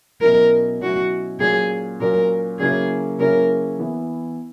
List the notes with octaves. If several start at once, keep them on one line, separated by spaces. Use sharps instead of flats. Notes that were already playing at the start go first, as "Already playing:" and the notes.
B2 F#3 C#4 E4 A#4
B2 F#3 C#4 E4 F#4
A#2 F#3 C#4 G#4
A#2 F#3 C#4 A#4
C#3 F#3 A#3 C#4 E4 G#4
C#3 F#3 A#3 C#4 E4 A#4
E3 B3 E4